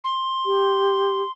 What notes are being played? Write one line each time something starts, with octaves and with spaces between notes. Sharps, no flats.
C6
G4